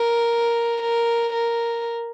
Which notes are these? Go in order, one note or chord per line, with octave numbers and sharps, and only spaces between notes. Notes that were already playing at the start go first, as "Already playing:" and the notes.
Already playing: A#4
A#4
A#4